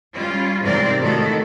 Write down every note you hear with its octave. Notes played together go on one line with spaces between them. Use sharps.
G3 C#4 F4
G#2 C3 E3 C4 A#4 D5
A2 D#3 A3 F#4 A4